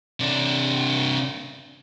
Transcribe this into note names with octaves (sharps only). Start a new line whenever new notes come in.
C3 D4